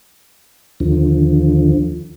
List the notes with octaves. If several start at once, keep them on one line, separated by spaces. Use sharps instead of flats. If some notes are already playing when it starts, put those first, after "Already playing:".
D#2 D3 F3